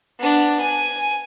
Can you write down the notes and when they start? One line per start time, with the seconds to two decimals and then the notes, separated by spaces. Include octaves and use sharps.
0.19 B3 D4
0.60 G#5